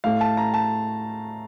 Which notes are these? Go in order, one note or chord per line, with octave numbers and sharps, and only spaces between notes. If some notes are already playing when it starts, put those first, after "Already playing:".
A2 A3 F5
A5
A#5
A5